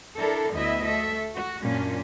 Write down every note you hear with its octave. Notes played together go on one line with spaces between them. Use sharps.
D4 E4 A4 A#4
D2 B3 E4 D#5 E5
A3 A4 E5
F#4
F#2 A#2 C#4 D4